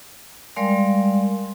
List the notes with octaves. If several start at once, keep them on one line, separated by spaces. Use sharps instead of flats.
G3 G#3 A#4 D5 F5 C6